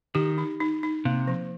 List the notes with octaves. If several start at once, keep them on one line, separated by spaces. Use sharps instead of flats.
D#3 G4
D#4
D#4
D#4
C3 A#3
F3